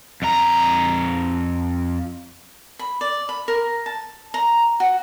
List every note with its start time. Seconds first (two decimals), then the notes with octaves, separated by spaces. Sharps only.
0.22 F2 A#5
2.79 B5
3.01 D5
3.29 B5
3.48 A#4
3.86 A5
4.34 A#5
4.80 F#4